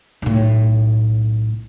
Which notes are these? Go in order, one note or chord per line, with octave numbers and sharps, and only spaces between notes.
B1 A2